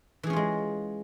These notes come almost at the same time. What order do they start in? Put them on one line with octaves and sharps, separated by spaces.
E3 G#4 C#4 F4 G#3